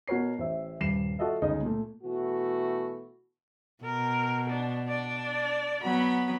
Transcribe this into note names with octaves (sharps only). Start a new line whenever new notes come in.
B2 F#4 A#4 C#5 C7
A1 C5 E5
D#1 G2 C7 E7
F4 F#4 A4 D#5 E5
G1 C#2 C#3 D#4 D#5
A#2 A3
B2 E3 A3 F#4
B2 A#4
D4
D4 D5
F#3 B3 B5